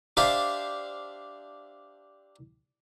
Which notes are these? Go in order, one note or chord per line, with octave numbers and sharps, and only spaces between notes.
D4 G4 C5 E5 F5 A5